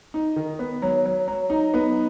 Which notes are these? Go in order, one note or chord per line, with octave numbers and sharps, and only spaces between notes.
D#4
D#3
B3
F#3
F#3
F#3
D#4
B3